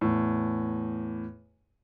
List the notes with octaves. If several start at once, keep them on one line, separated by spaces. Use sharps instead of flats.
E2 A2